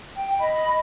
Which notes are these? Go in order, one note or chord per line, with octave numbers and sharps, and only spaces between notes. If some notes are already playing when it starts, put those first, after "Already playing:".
G5
D#5 B5